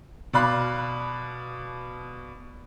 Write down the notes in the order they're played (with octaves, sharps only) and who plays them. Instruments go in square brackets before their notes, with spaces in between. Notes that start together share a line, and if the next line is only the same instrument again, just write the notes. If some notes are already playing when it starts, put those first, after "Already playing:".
[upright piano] B2 D5 F5 B5 F#6